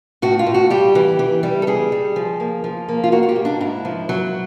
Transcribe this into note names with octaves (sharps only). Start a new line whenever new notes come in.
A2 F#4
F4
A2
F#4
G3 G4
E3
E3
G3
A4
G3 G#4
G3
F3
A#3
F3
A#3
F4
A#3 F#4
F#4
G4
G#2
D4
G#2 E4
F3
F#3